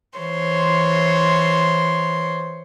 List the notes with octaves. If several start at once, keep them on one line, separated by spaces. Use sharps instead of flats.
E3 C5 C#5 C6